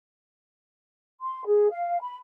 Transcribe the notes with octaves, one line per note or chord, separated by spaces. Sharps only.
C6
G#4
F5
B5